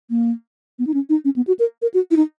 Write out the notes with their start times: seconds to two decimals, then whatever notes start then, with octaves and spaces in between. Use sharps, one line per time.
0.10 A#3
0.79 B3
0.87 D#4
0.94 C#4
1.09 D#4
1.25 C#4
1.36 B3
1.47 F#4
1.59 A#4
1.82 A#4
1.94 F#4
2.11 E4
2.17 D#4